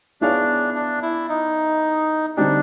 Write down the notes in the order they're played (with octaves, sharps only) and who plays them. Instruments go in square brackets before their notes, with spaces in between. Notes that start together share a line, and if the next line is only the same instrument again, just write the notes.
[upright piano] B3 E4 G#4 C#5 F5 [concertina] D4
[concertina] D4
E4
D#4
[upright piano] D3 G3 C4 D#4 G4 [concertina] D4